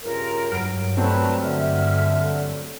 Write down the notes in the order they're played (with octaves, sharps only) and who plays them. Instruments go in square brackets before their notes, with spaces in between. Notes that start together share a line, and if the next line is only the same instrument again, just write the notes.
[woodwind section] G2 C#3 F4 [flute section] A#4
[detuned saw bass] G2 [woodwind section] F#3 [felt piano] F6 D7
[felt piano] F#3 A3 C4 [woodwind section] G3 F#4 [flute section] B4 A5 A#5
[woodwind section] D3 [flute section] E5 F6